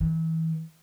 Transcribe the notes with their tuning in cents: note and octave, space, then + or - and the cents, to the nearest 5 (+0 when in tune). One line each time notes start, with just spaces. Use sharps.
E3 -30